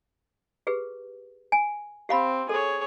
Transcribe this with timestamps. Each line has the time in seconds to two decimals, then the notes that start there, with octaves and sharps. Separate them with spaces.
0.67 G4 G#4 B4
1.52 G#5
2.09 C4 G4 F5 B5
2.49 G#4 A4 C#5